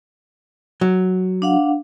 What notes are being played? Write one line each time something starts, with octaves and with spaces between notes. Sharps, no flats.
F#3
D4 F5 F#5